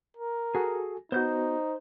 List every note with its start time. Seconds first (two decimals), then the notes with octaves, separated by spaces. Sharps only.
0.17 A#4
0.55 F#4 G#4 A4 G#5
1.12 B3 D#4 F#4 C5 G6